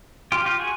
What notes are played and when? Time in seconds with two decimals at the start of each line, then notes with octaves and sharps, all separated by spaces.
0.32 F4 G4
0.45 F4 G4
0.60 F#4 G#4